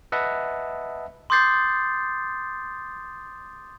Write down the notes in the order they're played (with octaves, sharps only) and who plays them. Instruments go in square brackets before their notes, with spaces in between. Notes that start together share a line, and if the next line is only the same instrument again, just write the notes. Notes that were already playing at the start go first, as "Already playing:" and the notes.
[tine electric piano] B4 D#5 E5 F#5 A5
[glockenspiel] C6 D6 D#6 G6 A6 C7